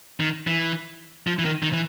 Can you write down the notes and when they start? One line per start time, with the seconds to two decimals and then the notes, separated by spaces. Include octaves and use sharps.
0.20 D#3
0.47 E3
1.27 F3
1.39 E3
1.45 D#3
1.63 D#3
1.73 E3